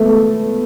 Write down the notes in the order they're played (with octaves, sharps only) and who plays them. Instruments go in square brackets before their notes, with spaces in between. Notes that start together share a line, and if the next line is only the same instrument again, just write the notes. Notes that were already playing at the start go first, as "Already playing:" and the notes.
Already playing: [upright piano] A3 B3 A4